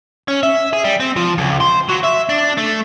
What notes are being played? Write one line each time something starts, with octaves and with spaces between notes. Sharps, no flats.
C#4
E5
G#4
G3
C4
F3
C#2
C5
F#3
E5
D4
A3